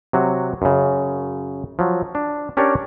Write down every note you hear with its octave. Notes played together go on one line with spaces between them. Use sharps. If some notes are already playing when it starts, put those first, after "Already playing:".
C3 F#3 F#4
F#2 C#3
F3 F#3
D4
C#4 D4 G4 A#4 C#5 D5